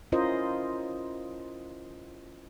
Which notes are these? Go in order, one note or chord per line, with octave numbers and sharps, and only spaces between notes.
C#4 E4 F4 A#4 C5 D#5